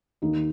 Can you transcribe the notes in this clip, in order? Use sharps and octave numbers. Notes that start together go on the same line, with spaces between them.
D#2 D#4